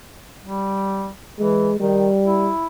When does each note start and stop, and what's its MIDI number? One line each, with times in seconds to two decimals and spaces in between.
0.43 1.10 55
1.39 1.70 52
1.39 1.79 56
1.80 2.08 51
1.80 2.51 55
2.26 2.66 64